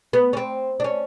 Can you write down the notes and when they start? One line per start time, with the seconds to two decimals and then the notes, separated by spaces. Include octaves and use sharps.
0.13 B3
0.33 C#4
0.37 C4
0.80 D4
0.84 C#4